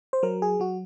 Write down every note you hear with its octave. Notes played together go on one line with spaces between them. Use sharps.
C5
F#3 A#4
G#4
F#3 F#4